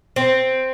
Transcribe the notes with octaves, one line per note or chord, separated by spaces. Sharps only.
C4